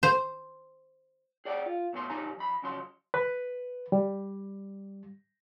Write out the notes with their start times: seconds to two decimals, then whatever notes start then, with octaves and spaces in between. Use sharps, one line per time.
0.03 C5
1.45 G#4 D5 F#5 G5
1.66 F4
1.93 B1 B2 A3 A4 C6
2.10 G2 B2 D#4 G4 G#5 A#5
2.37 F2 B5
2.62 F2 C#3 F#3 C6
3.14 B4
3.92 G3